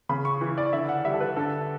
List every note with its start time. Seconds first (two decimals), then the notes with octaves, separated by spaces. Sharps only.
0.09 C#3 B5
0.25 C#6
0.41 E3
0.58 D5
0.73 D3 E5
0.89 F#5
1.05 G3 E5
1.14 A4
1.20 B4
1.36 D3 A4